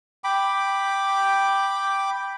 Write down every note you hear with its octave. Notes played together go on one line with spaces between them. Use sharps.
G5 B5 D6